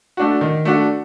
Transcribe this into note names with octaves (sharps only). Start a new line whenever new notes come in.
A3 D4 F#4
D#3
A3 D4 F#4